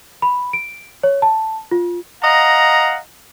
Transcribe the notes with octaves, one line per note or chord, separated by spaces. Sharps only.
B5
D7
C#5
A5
F4
D#5 F5 F#5 A#5